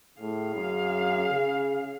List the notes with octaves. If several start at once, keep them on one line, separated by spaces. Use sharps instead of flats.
A2 G#4 F5
F#2
C#3